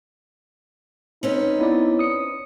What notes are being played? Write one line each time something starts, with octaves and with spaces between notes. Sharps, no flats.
C4 C#4 D#4 B4
B3 E4 D5
D#6 C#7